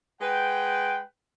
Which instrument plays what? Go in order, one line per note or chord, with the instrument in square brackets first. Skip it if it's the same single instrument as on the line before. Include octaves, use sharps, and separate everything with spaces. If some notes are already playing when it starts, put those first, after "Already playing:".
[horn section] G#3 B4 F#5 G5